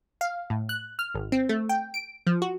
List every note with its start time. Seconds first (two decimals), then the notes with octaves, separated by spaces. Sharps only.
0.21 F5
0.50 A2
0.69 F#6
0.99 F6
1.15 G#1
1.32 C4
1.49 A3
1.69 G5
1.94 D7
2.27 F3
2.42 F#4